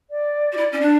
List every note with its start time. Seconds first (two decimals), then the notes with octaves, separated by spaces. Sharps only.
0.10 D5
0.52 F#4
0.57 E4
0.72 C#4
0.81 D4